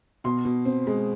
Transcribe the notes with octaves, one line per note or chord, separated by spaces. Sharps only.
B2 C6
B2
C4
G#3